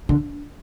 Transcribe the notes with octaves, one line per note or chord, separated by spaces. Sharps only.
D3